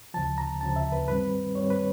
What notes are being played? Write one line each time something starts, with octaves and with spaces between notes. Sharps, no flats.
D2 C#3 F3 A5
A#5
D2 C#3 F3 A5
E5
B4
G2 D#3 G3 C4 B4
G2 D#3 G3 C4 C#5
B4